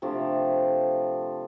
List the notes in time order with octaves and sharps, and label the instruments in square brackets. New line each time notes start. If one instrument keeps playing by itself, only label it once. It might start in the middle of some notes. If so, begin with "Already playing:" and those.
[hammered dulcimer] C3 F3 A3 D4